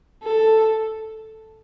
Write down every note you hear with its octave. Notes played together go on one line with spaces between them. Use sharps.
A4